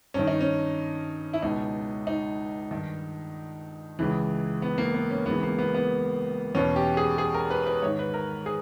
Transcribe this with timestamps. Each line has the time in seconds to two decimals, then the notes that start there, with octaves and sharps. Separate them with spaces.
0.14 G2 D#3 C#4
0.27 D#4
0.41 C#4
1.33 E4
1.42 C#2 B2 D#4
2.07 D#4
2.71 G2 D#3
3.99 C#2 C#3 E3
4.62 B3
4.78 A#3
4.94 B3
5.10 C#4
5.26 C#2 C#3 E3 B3
5.43 A#3
5.59 B3
5.74 B3
6.55 E2 B2 C#4
6.76 G4
6.97 G#4
7.18 G#4
7.34 A#4
7.51 B4
7.67 B4
7.82 G#2 D#3 C#5
7.99 B4
8.14 A#4
8.46 G#4